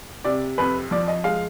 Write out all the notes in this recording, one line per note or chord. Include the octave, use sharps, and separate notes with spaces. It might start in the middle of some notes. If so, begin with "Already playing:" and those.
C3 D5
F2 B4
F3 D5
D#5
G#3 F5